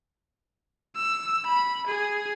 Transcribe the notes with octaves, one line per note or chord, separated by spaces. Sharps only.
E6
B5
G#4